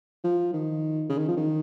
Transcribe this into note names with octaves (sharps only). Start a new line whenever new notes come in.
F3
D#3
C#3
D#3
F3
D#3